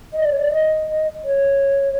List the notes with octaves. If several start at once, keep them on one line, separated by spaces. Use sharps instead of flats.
D#5
D5
C#5
D5
D#5
C#5